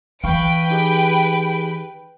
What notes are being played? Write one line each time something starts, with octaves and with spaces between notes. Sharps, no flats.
E3 F#3 B4 F5 G5 C#6 D7
D#4 G4 G#4